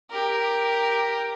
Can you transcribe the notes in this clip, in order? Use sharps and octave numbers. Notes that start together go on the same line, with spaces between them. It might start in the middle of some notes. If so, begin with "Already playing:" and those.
G4 A#4